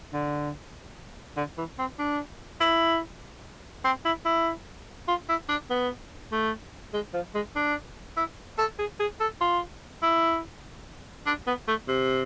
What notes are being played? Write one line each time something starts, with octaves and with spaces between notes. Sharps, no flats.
D3
D3
E3
C4
D4
E4
C4
E4
E4
F4
E4
D4
B3
A3
G#3
F3
G#3
D4
E4
A4
G#4
G#4
A4
F4
E4
D4
B3
A3
C3